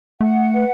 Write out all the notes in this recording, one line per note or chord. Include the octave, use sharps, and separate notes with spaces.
A3 F#5
B4